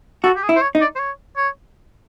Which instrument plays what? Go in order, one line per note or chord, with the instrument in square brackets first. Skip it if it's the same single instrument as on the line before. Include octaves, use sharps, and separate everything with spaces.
[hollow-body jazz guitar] F#4 [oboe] A4
[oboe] G4
G#4
[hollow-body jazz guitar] E4
[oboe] C5
C#5
[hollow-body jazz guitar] D#4
[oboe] D5
C5
C#5
C#5